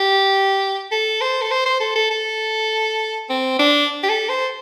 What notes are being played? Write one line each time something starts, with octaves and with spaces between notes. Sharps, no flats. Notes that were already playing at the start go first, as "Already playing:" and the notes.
Already playing: G4
A4
C5
A4
C5
C5
A4
A4
A4
C4
D4
G4
A4
C5